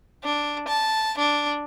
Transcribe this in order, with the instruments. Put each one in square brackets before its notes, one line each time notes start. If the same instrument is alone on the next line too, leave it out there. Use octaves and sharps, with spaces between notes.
[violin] D4
A5
D4